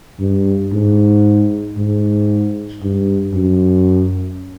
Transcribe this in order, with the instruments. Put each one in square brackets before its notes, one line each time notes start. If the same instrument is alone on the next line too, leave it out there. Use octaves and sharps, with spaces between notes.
[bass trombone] G2
G#2
G#2
G2
F#2